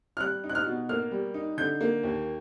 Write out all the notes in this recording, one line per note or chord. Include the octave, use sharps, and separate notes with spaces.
F6
G3 F#6
D#4
F#6
F6
B2
A#3 F6
G3
D#4
D3 G6
A#3
D#2